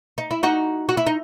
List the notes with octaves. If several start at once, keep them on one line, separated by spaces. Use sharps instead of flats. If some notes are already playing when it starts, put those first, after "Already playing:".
D#4
E4
D#4 F#4
F#4
E4
D#4